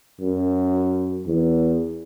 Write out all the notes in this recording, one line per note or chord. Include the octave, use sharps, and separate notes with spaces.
F#2
E2